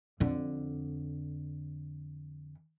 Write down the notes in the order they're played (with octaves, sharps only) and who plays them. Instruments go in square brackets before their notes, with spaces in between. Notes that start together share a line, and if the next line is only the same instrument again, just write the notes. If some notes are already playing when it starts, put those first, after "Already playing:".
[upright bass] F2 D3